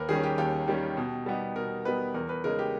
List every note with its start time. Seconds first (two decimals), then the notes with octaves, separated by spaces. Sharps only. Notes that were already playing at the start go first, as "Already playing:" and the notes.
Already playing: D#2 A#4 B4
0.09 D#3 G3 C#4 G#4
0.23 G4
0.38 D#2 G4
0.68 D#3 G3 C#4
0.97 B2
1.26 G3 B3 D#4
1.56 B2 A#4
1.85 G3 B3 D#4 B4
2.14 E2 A#4
2.29 B4
2.44 C#3 G#3 D#4 A#4
2.59 G4